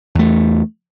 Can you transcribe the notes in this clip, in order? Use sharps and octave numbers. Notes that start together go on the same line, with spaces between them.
E2 A3